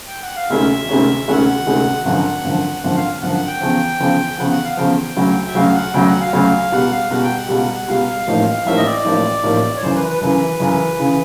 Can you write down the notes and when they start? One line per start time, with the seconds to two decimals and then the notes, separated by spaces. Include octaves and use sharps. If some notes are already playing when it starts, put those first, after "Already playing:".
0.08 G5
0.23 F#5
0.36 F5
0.50 D2 C3 D#3 G#3 C#4 E5
0.89 D2 C3 D#3 G#3 C#4
1.28 D2 C3 D#3 G#3 C#4 F#5
1.67 D2 C3 D#3 G#3 C#4
2.05 G#1 F#2 D3 F3 F#5
2.44 G#1 F#2 D3 F3
2.83 G#1 F#2 D3 F3 F#5
2.96 F5
3.22 G#1 F#2 D3 F3 F#5
3.35 F#5
3.47 G5
3.61 E2 C#3 F3
4.00 E2 C#3 F3
4.38 E2 C#3 F3 F#5
4.51 F#5
4.64 F5
4.77 E2 C#3 F3 G5
5.16 D2 C#3 F#3
5.47 E5
5.55 D2 C#3 F#3 F5
5.74 F#5
5.93 D2 C#3 F#3 G5
6.07 F#5
6.20 F5
6.33 D2 C#3 F#3
6.72 C#2 B2 G3 F#5
6.91 F5
7.10 C#2 B2 G3 F#5
7.23 G5
7.37 F#5
7.49 C#2 B2 G3
7.88 C#2 B2 G3 F5
8.27 A1 A2 F3 A#3 D#4
8.66 A1 A2 F3 A#3 D#4 E5
8.77 D#5
8.85 D5
9.04 A1 A2 F3 A#3 D#4
9.43 A1 A2 F3 A#3 D#4
9.76 C#5
9.82 F#2 C#3 E3 C5
9.96 B4
10.08 B4
10.21 F#2 C#3 E3 B4
10.60 F#2 C#3 E3
10.99 C#3 E3